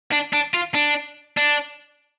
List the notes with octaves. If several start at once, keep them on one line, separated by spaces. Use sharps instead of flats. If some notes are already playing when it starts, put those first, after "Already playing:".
D4
D4
F4
D4
D4